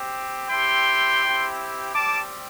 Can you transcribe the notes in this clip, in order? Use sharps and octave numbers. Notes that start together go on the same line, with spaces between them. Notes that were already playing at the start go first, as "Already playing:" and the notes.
Already playing: C4 G4
C4 E4 G4 G5 C6
C4 E4 G4
G3 C4 G4 A5 D6